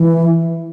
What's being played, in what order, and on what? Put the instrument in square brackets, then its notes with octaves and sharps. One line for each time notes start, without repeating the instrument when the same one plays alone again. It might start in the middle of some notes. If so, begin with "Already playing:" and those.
Already playing: [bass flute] E3